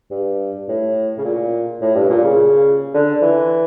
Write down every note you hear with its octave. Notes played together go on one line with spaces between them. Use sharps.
G2
A2
C#3
A#2
A2
G2
A#2
C#3
D3
E3